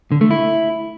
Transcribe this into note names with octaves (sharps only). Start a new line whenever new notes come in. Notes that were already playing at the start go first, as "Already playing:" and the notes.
D3
A3
E4